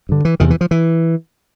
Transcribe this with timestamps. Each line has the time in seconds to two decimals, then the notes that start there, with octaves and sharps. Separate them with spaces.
0.09 G2 D3
0.25 E3
0.40 E2 C3 D#3
0.50 E3
0.61 F3
0.71 E3